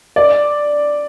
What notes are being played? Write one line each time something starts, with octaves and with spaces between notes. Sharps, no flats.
D5